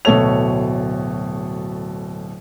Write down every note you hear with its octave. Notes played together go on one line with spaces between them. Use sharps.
D1 B2 A3 A4 C#5 F7